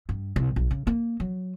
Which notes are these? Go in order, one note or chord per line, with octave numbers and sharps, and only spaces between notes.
G2
C2
B1
C#3
A#3
F#3